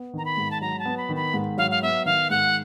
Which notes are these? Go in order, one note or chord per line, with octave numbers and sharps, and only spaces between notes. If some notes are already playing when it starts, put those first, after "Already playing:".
Already playing: B3
D#3 A#5
B5
G#2
A5
F#3 A#5
A5
B3
B5
D#3
B5
G#2
F#3 F5
F5
B3 E5
D#3 F5
G#2 F#5